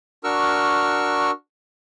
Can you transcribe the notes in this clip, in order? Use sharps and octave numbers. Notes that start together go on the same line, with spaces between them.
D4 F#4 A#4 C#6 E6 F6